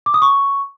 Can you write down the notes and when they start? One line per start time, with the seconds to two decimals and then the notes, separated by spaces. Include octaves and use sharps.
0.06 D6
0.14 D#6
0.22 C#6